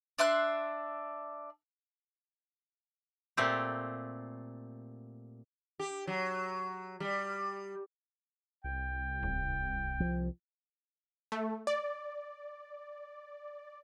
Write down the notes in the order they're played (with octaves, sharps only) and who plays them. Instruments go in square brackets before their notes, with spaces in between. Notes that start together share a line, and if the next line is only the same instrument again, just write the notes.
[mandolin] D4 E5 C6 F#6
[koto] A#2 A3 C4 G4
[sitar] G4
F#3
G3
[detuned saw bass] C2 [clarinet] G5
[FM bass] D1
[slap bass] F3
[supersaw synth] A3
D5